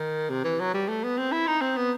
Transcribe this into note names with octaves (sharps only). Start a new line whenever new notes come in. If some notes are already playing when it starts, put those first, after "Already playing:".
Already playing: D#3
C3
E3
F#3
G3
A3
B3
C4
E4
D#4
C4
B3